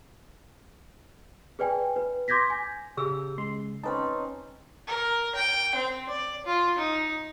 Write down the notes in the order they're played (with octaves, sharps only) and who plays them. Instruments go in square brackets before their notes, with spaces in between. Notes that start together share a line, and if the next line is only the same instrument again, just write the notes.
[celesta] G#4 B4 D5 G5 G#5
B4
C6 D6 G6 G#6 A#6 B6
G#5
[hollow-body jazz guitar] C#3 G4 [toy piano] G#4 E6
[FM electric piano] C#3 G#3 [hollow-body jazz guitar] C6
[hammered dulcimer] C4 C#4 D#4 [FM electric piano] B4 A5
[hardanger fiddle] A#4
G5
C4
D5
F4
D#4